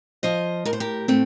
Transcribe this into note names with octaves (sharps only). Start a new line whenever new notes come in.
F3 C5 D#5
A2 A#4
C5
G4 A#4
A2 A3 C4